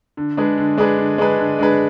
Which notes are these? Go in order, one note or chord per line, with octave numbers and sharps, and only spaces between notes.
D3
G#3 D4 G#4 B4
D3
G#3 D4 G#4 B4
D3
G#3 D4 G#4 B4
D3
G#3 D4 G#4 B4